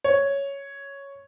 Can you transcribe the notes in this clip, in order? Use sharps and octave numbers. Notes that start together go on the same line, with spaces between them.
C#5